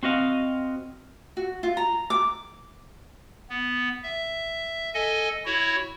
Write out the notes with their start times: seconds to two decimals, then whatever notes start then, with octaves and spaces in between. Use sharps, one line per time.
0.03 C4 F#4 D#5 F5
1.37 F#4
1.63 F4
1.77 A#5
2.10 D6
3.50 B3
4.03 E5
4.94 A4 D#5 G#5
5.45 E4 F#4 C#5